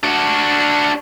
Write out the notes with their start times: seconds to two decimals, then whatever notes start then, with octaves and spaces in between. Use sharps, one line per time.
0.03 D4 F#4